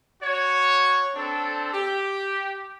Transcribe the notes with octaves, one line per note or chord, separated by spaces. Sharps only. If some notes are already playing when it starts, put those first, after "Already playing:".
F#4 C#5
C4 D4 A4
G4